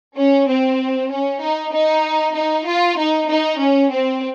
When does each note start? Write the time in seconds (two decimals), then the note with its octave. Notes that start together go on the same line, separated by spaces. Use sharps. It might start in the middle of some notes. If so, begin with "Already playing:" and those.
0.17 C#4
0.48 C4
1.10 C#4
1.41 D#4
1.72 D#4
2.34 D#4
2.66 F4
2.97 D#4
3.28 D#4
3.59 C#4
3.90 C4